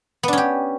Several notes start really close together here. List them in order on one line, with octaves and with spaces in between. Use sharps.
B3 D4 C#4 G4